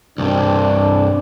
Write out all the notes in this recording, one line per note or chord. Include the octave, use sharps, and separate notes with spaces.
C2 G2 D4